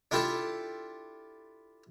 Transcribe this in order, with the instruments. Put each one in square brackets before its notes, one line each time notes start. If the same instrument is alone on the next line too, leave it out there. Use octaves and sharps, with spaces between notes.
[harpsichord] D4 E4 F4 G4 A4